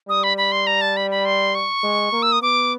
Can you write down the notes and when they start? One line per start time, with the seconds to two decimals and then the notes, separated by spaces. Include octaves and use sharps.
0.09 G3 D#6
0.23 B5
0.37 B5
0.52 C6
0.67 A#5
0.81 A5
0.97 B5
1.11 B5
1.25 C6
1.55 C#6
1.83 G#3
2.13 A#3
2.23 E6
2.32 D#6
2.42 B3 D6